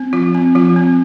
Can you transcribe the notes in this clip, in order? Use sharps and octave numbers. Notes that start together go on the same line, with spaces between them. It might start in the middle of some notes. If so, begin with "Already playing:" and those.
Already playing: C4
F3 F4
C4
F3 F4
C4